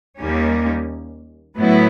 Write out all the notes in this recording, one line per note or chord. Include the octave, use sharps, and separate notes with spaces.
D#2 D#3 G3 A#3 C#4
A2 F#3 B3 E4